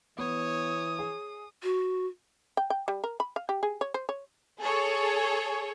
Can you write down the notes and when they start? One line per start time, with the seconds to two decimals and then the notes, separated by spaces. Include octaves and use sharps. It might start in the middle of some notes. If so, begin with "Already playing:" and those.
0.18 E3 B3 C#5 D#6
0.99 G#4
1.63 F#4
2.57 G5
2.70 G5
2.88 G3
3.04 A#4
3.20 B5
3.36 F5
3.49 G4
3.63 G#4
3.81 C#5
3.94 C5
4.09 C#5
4.60 G#4 A4 C#5